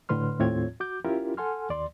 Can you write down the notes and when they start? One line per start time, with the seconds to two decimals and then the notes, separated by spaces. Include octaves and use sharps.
0.09 A2 D3 B4 C6 F6
0.39 D#2 A2 C4 F4 C#5 G#6
0.80 F#4 D6 G6
1.05 C#4 E4 F4 G4 A#4
1.37 A4 F#5 G#5 C6 F6
1.70 D#2 D5 C6